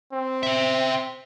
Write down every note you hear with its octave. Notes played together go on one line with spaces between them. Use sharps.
C4
C5 E5